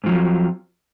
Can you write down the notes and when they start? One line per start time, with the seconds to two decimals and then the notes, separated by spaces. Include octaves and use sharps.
0.04 G#2
0.06 F3
0.09 F#3
0.11 F2